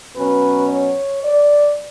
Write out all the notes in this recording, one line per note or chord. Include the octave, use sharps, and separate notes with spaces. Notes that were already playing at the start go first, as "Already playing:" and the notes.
B2 F#3 C#4 B4
C#5
D5